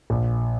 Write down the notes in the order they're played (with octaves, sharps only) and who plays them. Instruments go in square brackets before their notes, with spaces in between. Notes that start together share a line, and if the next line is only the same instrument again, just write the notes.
[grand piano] A#1